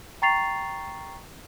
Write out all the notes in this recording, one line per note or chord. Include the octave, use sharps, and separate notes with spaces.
G5 A#5 C#6 A6 C7 F7